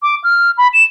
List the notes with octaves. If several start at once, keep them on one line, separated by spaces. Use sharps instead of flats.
D6
F6
B5
E7